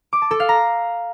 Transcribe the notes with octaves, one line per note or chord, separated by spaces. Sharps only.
D6
A5
A4
F5
A#5